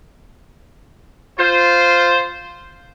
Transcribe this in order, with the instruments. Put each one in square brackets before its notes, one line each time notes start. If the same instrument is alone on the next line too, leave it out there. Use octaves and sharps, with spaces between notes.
[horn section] F4 C5